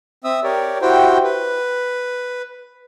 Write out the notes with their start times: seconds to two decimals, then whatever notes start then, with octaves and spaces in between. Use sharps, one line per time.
0.24 C4 E5 D#6 E6
0.43 G4 A#4 C#5 D5
0.82 E4 F#4 G4 C5 G5
1.24 B4